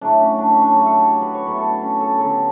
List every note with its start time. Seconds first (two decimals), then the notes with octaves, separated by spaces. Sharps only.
0.01 A2 F#3 A3 D4
0.20 C#4
0.38 D4
0.50 C#4
0.62 D4
0.73 A2 F#3 A3 F#4
0.86 A4
0.98 G4
1.10 F#4
1.22 B4
1.34 C#5
1.46 A2 F#3 B3 B4
1.58 A4
1.69 D4
1.81 C#4
2.00 A4
2.18 D3 F#3 B3 A4
2.29 G4